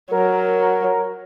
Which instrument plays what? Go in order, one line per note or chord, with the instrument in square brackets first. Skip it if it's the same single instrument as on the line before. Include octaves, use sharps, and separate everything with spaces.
[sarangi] F#3 [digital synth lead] A#4